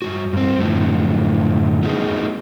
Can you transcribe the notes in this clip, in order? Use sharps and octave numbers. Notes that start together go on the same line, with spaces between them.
G2 D#3 F#4
G2 C4
F#2 A2 D3 F3
A3 B3 C#4 D#4 F#4 G#4